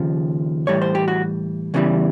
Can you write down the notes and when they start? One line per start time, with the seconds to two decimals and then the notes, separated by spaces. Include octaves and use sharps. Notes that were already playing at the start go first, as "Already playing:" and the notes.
Already playing: D#2 C#3 F3
0.67 A2 E3 G3 C#5
0.82 C5
0.95 G4
1.08 F#4
1.74 E2 C#3 E3 G3